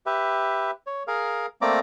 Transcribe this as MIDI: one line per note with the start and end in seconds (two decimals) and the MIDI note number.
0.06 0.71 67
0.06 0.71 71
0.06 0.71 76
0.87 1.03 73
1.07 1.46 68
1.07 1.46 70
1.07 1.46 77
1.62 1.79 57
1.62 1.79 58
1.62 1.79 60
1.62 1.79 74
1.62 1.79 82
1.62 1.79 86